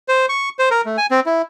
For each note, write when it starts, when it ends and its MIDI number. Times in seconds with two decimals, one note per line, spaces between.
0.08 0.26 72
0.29 0.49 85
0.59 0.69 72
0.71 0.81 70
0.86 0.97 57
0.97 1.06 80
1.11 1.20 60
1.26 1.42 64